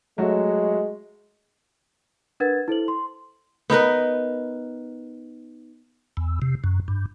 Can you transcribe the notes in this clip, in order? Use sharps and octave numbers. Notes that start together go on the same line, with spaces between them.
F#3 G#3 A3 F#4
D4 A#4 B4 F#5 G#6 A6
E4 A4 C5 F#7
C6
B3 D#4 A#4 B4
E2
C3
F#2
G2